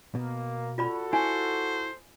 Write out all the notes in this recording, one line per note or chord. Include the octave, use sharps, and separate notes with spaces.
B2 A#3
F4 F#4 A4 D5 B5
E4 C5 G#5